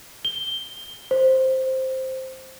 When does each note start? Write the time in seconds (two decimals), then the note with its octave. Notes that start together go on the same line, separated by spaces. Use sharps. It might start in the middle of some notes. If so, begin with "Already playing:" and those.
0.25 G7
1.11 C5